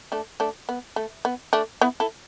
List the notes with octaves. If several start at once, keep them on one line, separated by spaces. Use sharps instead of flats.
A3 D4
A3 D4
B3
A3
B3
A3 D4
B3 E4
E4 A4